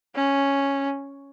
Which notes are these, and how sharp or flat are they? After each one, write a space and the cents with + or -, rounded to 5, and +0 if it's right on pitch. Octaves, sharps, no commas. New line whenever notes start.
C#4 +0